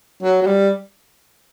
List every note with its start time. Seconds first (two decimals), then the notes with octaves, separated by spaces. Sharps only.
0.23 F#3
0.42 F#3
0.47 G3